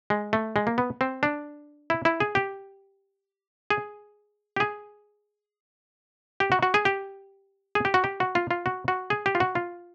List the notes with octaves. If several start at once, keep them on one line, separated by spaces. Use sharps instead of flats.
G#3
A3
G#3
A#3
B3
C4
D4
E4
E4
G#4
G4
G#4
G4
G#4
G4
F#4
F#4
G#4
G4
G#4
G4
F#4
G4
F#4
F4
F4
F#4
F#4
G#4
G4
F4
F#4
F4